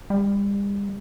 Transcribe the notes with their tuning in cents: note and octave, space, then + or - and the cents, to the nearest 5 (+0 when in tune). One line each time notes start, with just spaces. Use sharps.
G3 +40